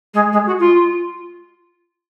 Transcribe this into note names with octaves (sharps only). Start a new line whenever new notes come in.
G#3
G#3
F#4
F4